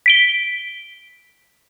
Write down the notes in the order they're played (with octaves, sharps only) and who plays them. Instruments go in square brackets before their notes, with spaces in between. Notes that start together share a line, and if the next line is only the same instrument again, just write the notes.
[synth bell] B6 D7 G7